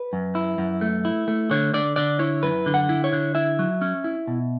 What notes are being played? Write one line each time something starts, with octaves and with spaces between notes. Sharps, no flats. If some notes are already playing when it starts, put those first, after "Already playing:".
Already playing: B4
F#2
E4
F#2
A3
E4
A3
D3 C#5
D3 D5
D3 D5
E4 C#5
F#2 B4
D3
F#5
E4
C#5
D3
E4 E5
F#3
C#4
E4
B2